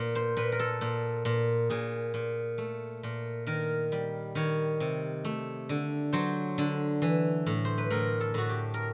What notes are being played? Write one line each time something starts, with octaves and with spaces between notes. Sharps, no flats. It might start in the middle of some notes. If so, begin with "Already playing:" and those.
Already playing: A#2
C5
A#2 B4
A#4
A4
A#2
A#2
A#2 G#4
A#2
A3
A#2
D#3 A#4
G3
D#3 C#5
C3
A3
D3
F#3 C5
D3
E3
A2
C5
B4
A2 A#4
A4
A2 F#4
G4
A#4